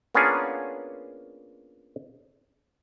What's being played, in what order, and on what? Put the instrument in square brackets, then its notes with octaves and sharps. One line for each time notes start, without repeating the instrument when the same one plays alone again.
[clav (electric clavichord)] A#3 B3 C#4 D4 F4 G#4